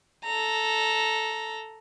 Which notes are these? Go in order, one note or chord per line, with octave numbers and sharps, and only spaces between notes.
A4 A#5